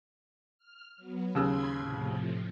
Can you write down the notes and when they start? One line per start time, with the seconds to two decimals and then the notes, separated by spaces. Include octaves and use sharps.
0.58 F6
0.96 F#3 B3
1.35 D#2 C#3 B5 C6 E6 G#6
1.77 A2 C3 F3